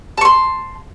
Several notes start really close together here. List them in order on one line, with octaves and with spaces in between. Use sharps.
A5 C#6 C6